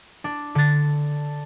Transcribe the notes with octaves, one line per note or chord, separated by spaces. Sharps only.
D4
D3 A6